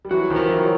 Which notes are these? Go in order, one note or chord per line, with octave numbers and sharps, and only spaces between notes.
G3
E3 F#3 F#4
D#3 F3
A#4
E3 F#3
F#3